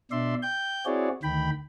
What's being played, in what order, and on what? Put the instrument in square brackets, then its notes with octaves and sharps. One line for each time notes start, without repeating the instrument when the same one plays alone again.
[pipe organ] B2 D4 D5 E5 C6
G5 G6
C4 E4 F#4 G#4 C#5 D5
D2 D#3 G5 B5